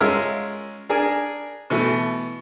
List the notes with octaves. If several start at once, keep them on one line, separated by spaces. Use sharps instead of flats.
G#3 C#4 F4 A#4 E5 F6
D4 G#4 A#4 G#5
B2 E3 A3